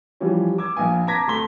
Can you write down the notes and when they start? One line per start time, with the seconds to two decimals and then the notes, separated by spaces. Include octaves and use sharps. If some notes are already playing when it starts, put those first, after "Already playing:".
0.20 E3 F3 G3 C#4
0.58 D6 E6 G#6
0.76 A#1 F5 G#5 D#6
1.07 A5 A#5 D6 G#6 A#6 B6
1.27 D2 A3 A4 C6 B6 G7